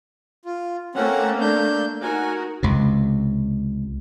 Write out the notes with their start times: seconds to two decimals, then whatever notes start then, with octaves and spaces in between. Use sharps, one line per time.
0.45 F4
0.95 A3 A#3 C4 C#4 F#5
1.41 D4 G6
2.03 D#4 F#4 A#4 G#5
2.63 C#2 C3